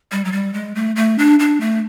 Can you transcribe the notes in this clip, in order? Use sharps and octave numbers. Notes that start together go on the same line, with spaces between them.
G3
F#3
G3
G#3
A3
A3
D4
D4
A3